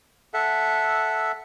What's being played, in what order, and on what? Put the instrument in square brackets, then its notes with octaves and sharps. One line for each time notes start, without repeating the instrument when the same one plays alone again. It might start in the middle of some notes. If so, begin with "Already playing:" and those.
[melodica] A4 E5 F#5